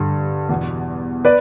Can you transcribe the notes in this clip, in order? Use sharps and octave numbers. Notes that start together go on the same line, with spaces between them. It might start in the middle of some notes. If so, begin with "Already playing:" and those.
Already playing: G2 D3
E2 B2
B4 D5